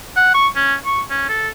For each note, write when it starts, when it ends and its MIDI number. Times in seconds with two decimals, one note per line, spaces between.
0.16 0.32 78
0.34 0.47 85
0.55 0.74 61
0.85 1.01 85
1.10 1.28 61
1.29 1.48 69